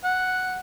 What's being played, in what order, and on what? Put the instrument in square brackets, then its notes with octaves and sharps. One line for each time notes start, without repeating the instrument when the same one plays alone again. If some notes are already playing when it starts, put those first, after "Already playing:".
[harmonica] F#5